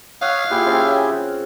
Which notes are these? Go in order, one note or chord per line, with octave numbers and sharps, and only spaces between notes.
C#5 F5 F#5 D#6
A#2 E4 G4 G#4
C#3 C4 C#4